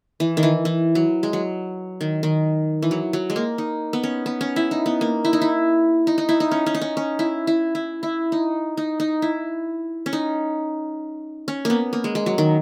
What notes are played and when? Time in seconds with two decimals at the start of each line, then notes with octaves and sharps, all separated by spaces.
0.20 E3
0.37 D#3
0.43 E3
0.65 E3
0.95 F#3
1.23 G#3
1.33 F#3
2.01 D#3
2.23 D#3
2.82 E3
2.91 F#3
3.13 F#3
3.30 G#3
3.36 A#3
3.58 D#4
3.93 B3
4.03 C#4
4.26 B3
4.41 C#4
4.56 E4
4.71 D#4
4.86 B3
5.01 A#3
5.25 E4
5.33 D#4
5.42 E4
6.07 D#4
6.18 D#4
6.29 E4
6.40 D#4
6.51 C#4
6.66 C#4
6.74 D#4
6.81 C#4
6.97 C#4
7.19 E4
7.47 E4
7.75 E4
8.03 E4
8.32 D#4
8.77 D#4
9.00 D#4
9.22 E4
10.06 C#4
10.13 D#4
11.48 C#4
11.65 A#3 B3
11.93 A#3
12.04 G#3
12.15 G#3
12.26 F#3
12.38 D#3